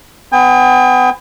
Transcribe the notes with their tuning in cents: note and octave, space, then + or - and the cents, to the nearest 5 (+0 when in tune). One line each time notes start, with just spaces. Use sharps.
B3 +30 G5 +45